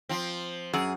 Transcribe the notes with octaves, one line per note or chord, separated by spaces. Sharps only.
F3 C4
F#2 G#4